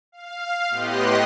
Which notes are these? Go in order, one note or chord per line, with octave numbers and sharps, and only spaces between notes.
F5
A2 B3 G4 D#5 C6 F#6